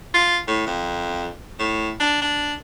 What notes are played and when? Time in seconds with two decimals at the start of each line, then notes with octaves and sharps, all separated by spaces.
0.14 F4
0.48 A2
0.66 F2
1.59 A2
2.00 D4
2.21 D4